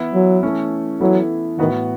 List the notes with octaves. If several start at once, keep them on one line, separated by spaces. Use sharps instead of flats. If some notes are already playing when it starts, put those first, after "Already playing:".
Already playing: E3 B3 E4
F#3
E3 A3 C#4
E3 F#3 B3 E4 A4
A2 D#3 E3 B3 F#4